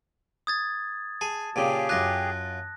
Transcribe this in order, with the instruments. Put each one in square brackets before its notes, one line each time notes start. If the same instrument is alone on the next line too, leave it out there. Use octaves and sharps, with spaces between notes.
[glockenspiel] D#6 G#6 A6
[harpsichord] G#4 [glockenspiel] A5
[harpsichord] A#2 C#3 [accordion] G4 G#4
[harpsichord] F#2 F4 [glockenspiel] F#6 A#6